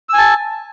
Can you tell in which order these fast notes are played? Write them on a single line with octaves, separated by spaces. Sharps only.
E6 G#5 A5